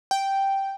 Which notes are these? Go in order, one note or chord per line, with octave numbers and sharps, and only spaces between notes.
G5